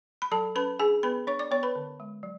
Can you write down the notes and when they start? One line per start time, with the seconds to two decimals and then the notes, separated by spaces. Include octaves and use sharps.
0.22 B5
0.31 F#3 A4 A5
0.55 C#4 B4 B5
0.79 D4 G#4 G#5
1.03 B3 B4 B5
1.27 D4 C#5 C#6
1.39 D5 D6
1.51 B3 C#5 C#6
1.63 B4 B5
1.75 D3
2.00 G#3
2.23 F#3